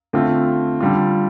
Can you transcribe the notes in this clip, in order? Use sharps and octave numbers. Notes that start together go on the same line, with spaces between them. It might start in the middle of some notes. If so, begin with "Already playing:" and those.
D3 A3 C4 F4
D3 G3 F4